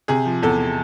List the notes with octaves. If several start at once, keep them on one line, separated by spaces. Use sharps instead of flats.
C3 G#4
F3
E2 A4